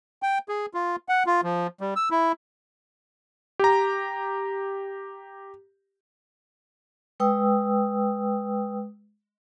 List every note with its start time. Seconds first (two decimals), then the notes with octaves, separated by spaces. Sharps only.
0.23 G5
0.49 G#4
0.74 F4
1.09 F#5
1.26 F4
1.44 F3
1.81 G3
1.96 E6
2.11 E4
3.59 G4 A#5
7.20 G#3 B4 G5 D#6 E6